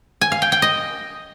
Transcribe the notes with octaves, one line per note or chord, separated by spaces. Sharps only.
G#5
F5
G5
G5
D#5